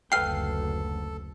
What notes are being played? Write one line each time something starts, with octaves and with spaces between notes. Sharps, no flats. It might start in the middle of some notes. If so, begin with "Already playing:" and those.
F#1 D2 A4 B4 F5 G5 F6 C7